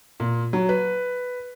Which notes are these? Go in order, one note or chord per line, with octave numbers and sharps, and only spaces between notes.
A#2
F#3
B4